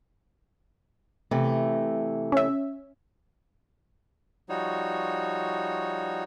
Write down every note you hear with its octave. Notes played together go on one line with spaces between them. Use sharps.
C3 E3 A3
C#4 E5
F3 G3 D#4 F#4 C#5